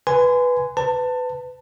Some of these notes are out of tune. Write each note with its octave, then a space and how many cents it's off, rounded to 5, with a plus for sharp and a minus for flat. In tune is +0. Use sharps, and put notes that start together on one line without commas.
B4 +0 G#5 +0 C6 -30
B4 +25 A5 +20